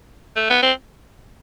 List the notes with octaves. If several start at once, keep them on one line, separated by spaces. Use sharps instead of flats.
A3
B3
C4